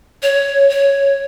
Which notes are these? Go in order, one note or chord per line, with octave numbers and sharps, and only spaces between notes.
C#5
C#5